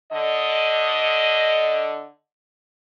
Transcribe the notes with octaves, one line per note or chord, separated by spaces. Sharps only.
D3 D#5